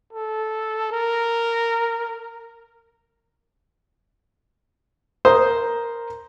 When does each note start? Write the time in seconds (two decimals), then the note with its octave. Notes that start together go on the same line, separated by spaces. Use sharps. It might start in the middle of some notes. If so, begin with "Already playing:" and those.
0.13 A4
0.91 A#4
5.25 A#4 C5 A#5 D#6